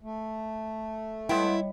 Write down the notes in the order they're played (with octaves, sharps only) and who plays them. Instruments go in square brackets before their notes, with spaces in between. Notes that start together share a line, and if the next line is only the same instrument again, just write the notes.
[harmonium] A3
[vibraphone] G3 C#5 D#5 [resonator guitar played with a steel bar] G#3 B3 G5 [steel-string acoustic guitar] E4